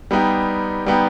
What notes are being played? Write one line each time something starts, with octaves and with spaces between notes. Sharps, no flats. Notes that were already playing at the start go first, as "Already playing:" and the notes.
G3 B3 D#4 G4
G3 B3 D#4 G4